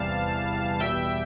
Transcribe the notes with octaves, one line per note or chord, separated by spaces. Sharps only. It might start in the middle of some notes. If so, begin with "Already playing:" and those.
Already playing: E2 C3 E3 G3 F5 A5
E2 B2 G3 E5 G5